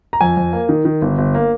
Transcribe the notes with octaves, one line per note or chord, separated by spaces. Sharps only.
A#5
F2 G#5
F2
A#3
D#3
D#3
G1
G1
A#3